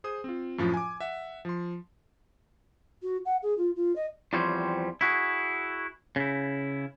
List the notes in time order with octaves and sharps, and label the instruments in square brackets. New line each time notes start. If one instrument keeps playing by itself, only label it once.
[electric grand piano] G#4 C5 D#6
C4 F4
F#2 A2 F3 A3 F4
G#5 D6
E5 F#5
F3 C6
[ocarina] F#4
F#5
G#4
F4
F4
D#5
[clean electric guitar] E2 F3 G3 C4 C5 C#5
E4 F#4 G#4
C#3 E4